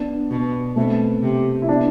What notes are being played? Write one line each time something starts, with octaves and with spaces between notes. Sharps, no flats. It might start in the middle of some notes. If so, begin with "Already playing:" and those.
Already playing: B3 D4
B2
B2 A3 C4
C3
E4
B3 D4